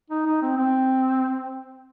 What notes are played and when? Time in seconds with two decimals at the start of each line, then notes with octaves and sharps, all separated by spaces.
0.10 D#4
0.26 D#4
0.42 C4
0.57 C4